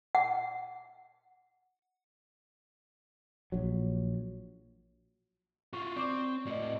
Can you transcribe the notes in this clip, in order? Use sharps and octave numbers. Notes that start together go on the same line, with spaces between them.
F#5
A#1 F#3
F4 F#4 C#6
C4 D5 C#6 D6
A2 F#4 D5 D#5